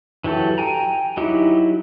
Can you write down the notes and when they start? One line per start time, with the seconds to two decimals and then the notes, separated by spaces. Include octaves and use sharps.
0.24 E3 F#3 G4 A4
0.58 G5 G#5 A#5
1.17 F#3 D#4 E4 G4